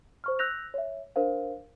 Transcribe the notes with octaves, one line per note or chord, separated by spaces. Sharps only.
C5 C#6 F6
E6 F#6 G6 A#6 F7
C#5 E5
D4 A#4 C5 F5